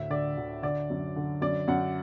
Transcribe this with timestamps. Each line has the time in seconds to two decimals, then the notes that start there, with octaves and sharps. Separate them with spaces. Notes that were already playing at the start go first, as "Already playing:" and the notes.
Already playing: D2 A2 E5
0.10 D3 D5
0.37 D2
0.62 D3 D5
0.90 F#2
1.16 D3
1.41 F#2 D5
1.68 F#2 F#5